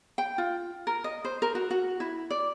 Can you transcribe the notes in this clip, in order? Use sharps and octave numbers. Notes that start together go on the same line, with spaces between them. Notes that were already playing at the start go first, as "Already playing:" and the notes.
G5
F4
A#4
D#5
C5
A#4
F#4
F#4
E4
D5